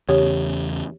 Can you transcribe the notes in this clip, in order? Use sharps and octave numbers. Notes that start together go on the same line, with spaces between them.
E2 C#3 G4 C#5